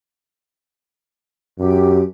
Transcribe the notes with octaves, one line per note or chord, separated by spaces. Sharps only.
F#2 G4